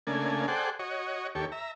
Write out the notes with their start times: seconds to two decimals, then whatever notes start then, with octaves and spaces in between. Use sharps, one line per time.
0.07 C#3 A3 A#3 D4 G#5
0.48 G#4 A4 C5 D5 F#5 G5
0.79 F#4 C#5 D#5
1.35 D#2 G4 A4 C#5
1.52 E5 A#5